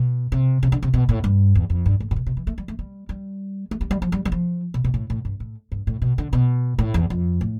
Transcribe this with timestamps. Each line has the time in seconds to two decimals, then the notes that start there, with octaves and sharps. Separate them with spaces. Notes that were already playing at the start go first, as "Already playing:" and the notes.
Already playing: B2
0.32 C3
0.63 C3
0.72 D3
0.83 C3
0.94 B2
1.09 A2
1.24 G2
1.55 E2
1.70 F2
1.86 G2
2.00 A2
2.11 A2
2.16 B2
2.26 C3
2.37 E3
2.47 A3
2.58 G3
2.68 A3
2.79 G3
3.09 G3
3.71 A3
3.81 G3
3.91 G3
4.02 F3
4.12 G3
4.25 G3
4.32 F3
4.74 B2
4.84 B2
4.94 A2
5.10 A2
5.25 G2
5.40 A2
5.72 G2
5.87 A2
6.02 B2
6.18 D3
6.33 B2
6.79 A2
6.94 E2
7.10 F2
7.41 A2